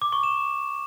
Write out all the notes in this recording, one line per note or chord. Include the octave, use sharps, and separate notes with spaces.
D6
C#6
E7